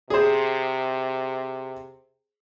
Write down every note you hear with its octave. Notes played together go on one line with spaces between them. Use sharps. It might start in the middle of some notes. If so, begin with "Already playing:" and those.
C3 G#4 C5